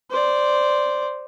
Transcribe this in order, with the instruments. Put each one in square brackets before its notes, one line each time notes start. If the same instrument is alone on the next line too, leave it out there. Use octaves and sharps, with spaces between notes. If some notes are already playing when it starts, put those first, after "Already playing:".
[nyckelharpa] C5 D5